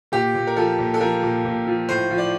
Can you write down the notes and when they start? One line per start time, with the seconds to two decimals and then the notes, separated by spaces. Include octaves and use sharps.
0.12 A#2 G4
0.34 A#2
0.47 A#4
0.56 F3 A4
0.78 A#2
0.94 A4
1.00 F3 A#4
1.23 A#2
1.45 A#2
1.67 F3
1.89 A2 C5
2.10 F3
2.18 D5